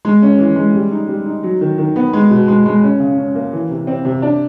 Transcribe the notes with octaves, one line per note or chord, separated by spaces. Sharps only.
G#3
C#4
E3
G#3
G3
D#4
G3
D#4
F#3
D#3
D#3
B3
G#3
B2
G#3
G#3
C#4
C#3
C#4
A#3
E3
C3
C4
C3
D4